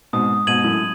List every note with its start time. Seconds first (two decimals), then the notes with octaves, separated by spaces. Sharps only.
0.13 G#2 B2 D#6
0.47 G#2 B2 G#6 D#7 F#7
0.64 F#2 A2